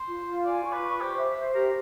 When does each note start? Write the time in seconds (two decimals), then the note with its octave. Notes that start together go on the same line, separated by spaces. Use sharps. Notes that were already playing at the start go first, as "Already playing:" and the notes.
Already playing: C5
0.08 F4
0.27 F4
0.45 D5 G#5
0.64 C#6
0.73 B4
0.83 C#6
1.00 G4 C5
1.18 E5
1.36 C5
1.55 G4 A#4